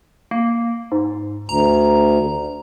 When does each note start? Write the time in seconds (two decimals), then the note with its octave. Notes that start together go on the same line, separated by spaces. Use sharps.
0.31 A#3
0.92 G#2
1.49 D2 A#5